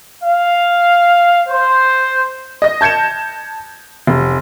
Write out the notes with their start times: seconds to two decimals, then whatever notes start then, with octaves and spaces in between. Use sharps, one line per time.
0.22 F5
1.48 C5
2.62 D#5 A#6
2.81 A5 G6 G#6 C#7 E7
4.07 F1